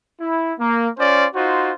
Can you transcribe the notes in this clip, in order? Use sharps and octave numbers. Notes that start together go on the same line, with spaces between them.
E4
A#3
C#4 F4 C5 D5
D#4 F4 F#4 C5